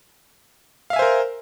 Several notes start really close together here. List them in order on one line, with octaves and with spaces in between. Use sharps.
F5 E5 G#5 C5 A#4